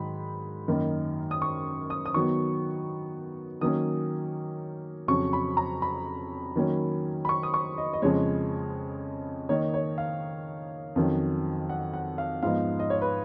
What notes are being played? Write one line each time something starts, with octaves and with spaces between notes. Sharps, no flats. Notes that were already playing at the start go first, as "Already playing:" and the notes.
Already playing: G#2 D#3 F#3 B5
F#2 D#3 A#3 D#4
D#6
C#6
D#6
D#6
D#3 F#3 B3 C#6
D#3 F#3 A#3 C#4 D#6
F2 C#3 F#3 C#4 C#6
B5
A#5
B5
D#3 F#3 A#3 C#4
B5
C#6
D#6
C#6
D#5
D#5
F2 C#3 F3 G#3 C#5
D#3 A#3 D#4 C#5
C#5
F5
F2 D#3 F#3 C#4
F#5
F#5
F5
G#2 F3 B3 D#4 F5
D#5
C#5
B4